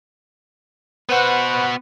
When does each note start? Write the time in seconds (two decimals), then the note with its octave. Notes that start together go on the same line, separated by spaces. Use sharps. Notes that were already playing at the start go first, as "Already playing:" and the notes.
1.09 B3 F#4 B4 C5 F#5